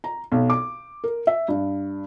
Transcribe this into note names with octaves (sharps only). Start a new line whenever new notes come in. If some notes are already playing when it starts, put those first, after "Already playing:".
A#5
B1
D6
A#4
E5
G2